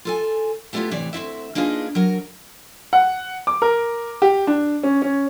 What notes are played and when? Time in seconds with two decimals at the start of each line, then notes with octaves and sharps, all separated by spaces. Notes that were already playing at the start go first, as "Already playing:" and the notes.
0.05 F4 A4 G#5
0.73 G3 A3 B3 E4 F4 G4
0.91 A2 C3 E3 C#5 D5
1.13 D2 C4 E4 E5
1.55 A#3 D4 D#4 F4 G#4 B4
1.95 F#3 A#4
2.93 F#5
3.47 D6
3.62 A#4
4.22 G4
4.47 D4
4.83 C#4
5.02 C#4